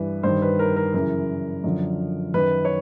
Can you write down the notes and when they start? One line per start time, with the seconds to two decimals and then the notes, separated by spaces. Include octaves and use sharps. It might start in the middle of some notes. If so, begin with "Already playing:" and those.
Already playing: G2 E3 B4
0.23 G2 D#3 C5
0.42 B4
0.59 A#4
0.76 A#4
0.94 F#2 C#3 E3 A#4
1.64 F#2 D3 F3
2.34 F#2 D#3 B4
2.65 C#5